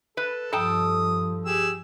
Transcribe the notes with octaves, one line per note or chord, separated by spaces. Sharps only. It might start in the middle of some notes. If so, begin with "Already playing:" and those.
A4 B4
G2 F3 A4 G5 A5 D#6
G4 G#4 E6